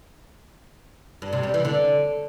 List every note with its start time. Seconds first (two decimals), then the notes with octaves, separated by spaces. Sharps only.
1.22 G2
1.33 C3
1.43 G3
1.54 E3
1.65 D3